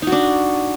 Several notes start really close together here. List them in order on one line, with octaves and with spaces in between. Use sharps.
D#4 F#4 D4